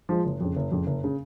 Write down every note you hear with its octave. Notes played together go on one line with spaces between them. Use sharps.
F3 G#3
F#1
F2 C#3
F#1
F2 C#3
F#1
C#3